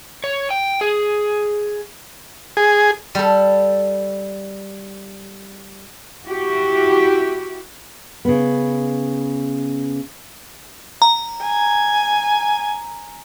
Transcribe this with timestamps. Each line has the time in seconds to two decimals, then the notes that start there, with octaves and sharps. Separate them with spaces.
0.24 C#5
0.51 G5
0.81 G#4
2.57 G#4
3.15 G3 A4
6.24 E4 F#4 G4
8.25 C#3 B3
11.02 A#5
11.42 G#5